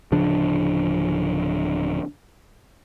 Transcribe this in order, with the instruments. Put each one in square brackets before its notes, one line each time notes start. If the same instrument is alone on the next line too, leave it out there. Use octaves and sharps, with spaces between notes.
[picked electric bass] D1 C#3 F3 D4